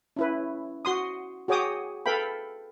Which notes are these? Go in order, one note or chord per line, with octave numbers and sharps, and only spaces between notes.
C#4 E4 B4
F#4 C6 D#6
F#4 G#4 C#5 G5 D6 D#6
A4 B4 F5 G5 B5